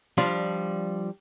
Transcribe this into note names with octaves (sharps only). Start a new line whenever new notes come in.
F3 G3 D4 F4